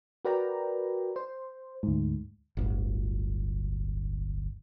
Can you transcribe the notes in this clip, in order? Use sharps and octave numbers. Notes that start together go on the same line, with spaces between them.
F#4 A#4 B4 D5 G5 A#5
C5
D2 G#2
D1 G1